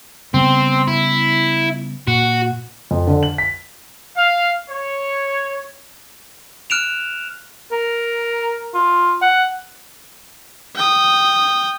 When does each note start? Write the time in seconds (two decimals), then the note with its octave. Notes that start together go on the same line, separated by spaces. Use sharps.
0.34 C#3 G3 B3 C4
0.88 E4
2.07 A#2 F#4
2.91 F2
3.07 D3
3.23 F#7
3.38 B6
4.17 F5
4.70 C#5
6.70 F6 F#6 D7 E7 F7
7.72 A#4
8.74 F4
9.22 F#5
10.76 G5 D#6